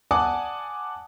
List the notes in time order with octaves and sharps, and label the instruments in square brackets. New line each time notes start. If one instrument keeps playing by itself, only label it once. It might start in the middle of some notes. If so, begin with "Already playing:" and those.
[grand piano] D5 F#5 G#5 A5 D6 D#6